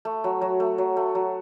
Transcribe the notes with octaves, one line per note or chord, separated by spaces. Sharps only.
A3
F#3
F#3
A3
F#3
A3
F#3